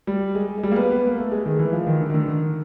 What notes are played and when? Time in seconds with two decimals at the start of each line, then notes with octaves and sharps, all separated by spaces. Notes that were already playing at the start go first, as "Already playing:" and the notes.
0.07 G3
0.35 G#3
0.58 G#3
0.63 G3
0.72 A#3
0.76 B3
0.91 B3
1.07 A#3
1.18 A3
1.32 G#3
1.46 D#3
1.59 E3
1.73 F3
1.87 D#3
2.01 D3
2.10 D#3
2.14 D3
2.28 D#3